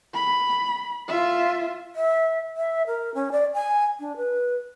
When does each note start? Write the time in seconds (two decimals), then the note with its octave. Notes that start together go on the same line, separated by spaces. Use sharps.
0.14 B5
1.08 F4 E5
1.96 E5
2.57 E5
2.87 A#4
3.15 C#4
3.32 D5
3.54 G#5
4.00 D4
4.16 B4